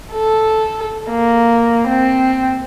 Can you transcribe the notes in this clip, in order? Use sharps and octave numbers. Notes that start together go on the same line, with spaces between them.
A4
A#3
C4